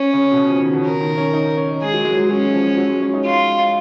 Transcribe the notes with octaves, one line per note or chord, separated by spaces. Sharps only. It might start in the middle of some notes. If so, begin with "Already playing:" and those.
Already playing: C#4
C#3
B2
C#3
F3
D#3
B2
A#4
D#3
C#4
D#4
C#4
G#3 G#4
F#3
G#3
F#3
F#3 C#4
F3
F#3
G#3
C#4
D#4
F4